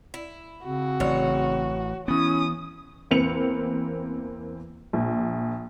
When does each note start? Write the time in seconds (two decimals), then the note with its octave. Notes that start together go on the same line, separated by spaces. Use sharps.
0.14 E4
0.64 C#3 C4 F#4
1.00 A1 C#5
2.08 E3 B3 C#4 E4 D#6
3.11 E2 A#3 C4 B4 C#7 F7
4.93 A#1